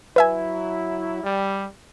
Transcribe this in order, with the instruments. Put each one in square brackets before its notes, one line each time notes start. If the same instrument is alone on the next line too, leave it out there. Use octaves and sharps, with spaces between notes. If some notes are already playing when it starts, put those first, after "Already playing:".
[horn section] F#3 E4 [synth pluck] B4 E5 G#5
[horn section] G3